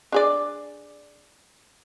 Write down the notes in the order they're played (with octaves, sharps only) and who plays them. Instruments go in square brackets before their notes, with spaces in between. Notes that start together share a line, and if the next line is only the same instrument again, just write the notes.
[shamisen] D4 G#4 D5